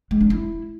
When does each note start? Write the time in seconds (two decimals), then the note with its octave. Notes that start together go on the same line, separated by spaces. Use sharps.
0.11 G#3
0.21 D4
0.30 E4